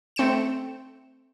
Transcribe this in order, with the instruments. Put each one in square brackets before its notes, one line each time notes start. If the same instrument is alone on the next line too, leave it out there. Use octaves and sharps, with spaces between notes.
[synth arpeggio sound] A3 C4 G5 C#7 E7